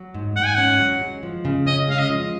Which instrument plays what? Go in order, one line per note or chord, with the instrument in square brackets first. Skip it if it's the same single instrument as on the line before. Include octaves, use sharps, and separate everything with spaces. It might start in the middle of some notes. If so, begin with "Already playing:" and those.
Already playing: [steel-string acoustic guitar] F#3
G#2
[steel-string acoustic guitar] G#2 [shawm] F#5
[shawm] G#5
[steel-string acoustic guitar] C#4 [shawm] F#5
[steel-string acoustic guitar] F#3
G#3
F3
C#3
[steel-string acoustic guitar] C#4 [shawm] D#5
[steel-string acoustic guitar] G#3 [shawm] F5
[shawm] D#5
[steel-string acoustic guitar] F3